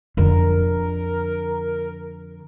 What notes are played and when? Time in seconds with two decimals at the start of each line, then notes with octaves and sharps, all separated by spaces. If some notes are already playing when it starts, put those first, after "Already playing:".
0.17 F2 D3 A#4